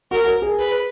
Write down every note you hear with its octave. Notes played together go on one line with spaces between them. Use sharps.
F#4 A#4
A#4
G#4
B4